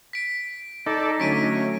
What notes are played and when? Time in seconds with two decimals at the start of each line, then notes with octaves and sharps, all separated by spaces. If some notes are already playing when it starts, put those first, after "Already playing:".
0.13 B6 D7
0.86 D#4 A4 D5
1.20 D3 F#3 A3 C#4 B6 D7 D#7